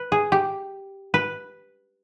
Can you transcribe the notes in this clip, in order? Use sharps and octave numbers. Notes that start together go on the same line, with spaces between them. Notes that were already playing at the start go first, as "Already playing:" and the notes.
Already playing: B4
G#4
G4
B4